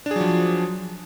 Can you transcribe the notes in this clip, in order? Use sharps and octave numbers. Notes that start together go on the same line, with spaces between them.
F3 F#3 D4 G#4